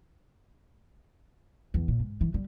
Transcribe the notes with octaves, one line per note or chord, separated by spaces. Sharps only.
E2
A#2
G#2
E3
G3